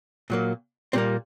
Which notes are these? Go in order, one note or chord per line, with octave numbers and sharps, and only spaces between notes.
A#2 F#3 A#3
A#2 G3 A#3 C4